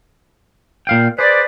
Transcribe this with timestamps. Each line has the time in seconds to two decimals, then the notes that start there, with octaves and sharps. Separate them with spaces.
0.87 A#2 F5 G5
1.19 G#4 B4 C5 D5